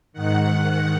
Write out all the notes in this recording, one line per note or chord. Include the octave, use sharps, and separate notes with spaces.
G#2 D#3 F#5